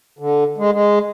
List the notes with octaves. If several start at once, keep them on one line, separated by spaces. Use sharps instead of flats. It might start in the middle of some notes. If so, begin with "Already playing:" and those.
D3
G#3
G#3